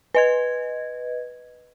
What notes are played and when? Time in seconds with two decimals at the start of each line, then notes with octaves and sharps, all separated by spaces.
0.15 B4 D#5 G#6